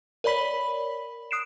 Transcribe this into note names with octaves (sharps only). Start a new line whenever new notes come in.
A#4 C#5 D5 B5 B6 F#7
D#6 F#6 C7 D7 E7